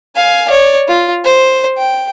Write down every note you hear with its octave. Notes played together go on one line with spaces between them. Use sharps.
F5 G#5
C#5 D5
F4
C5
G5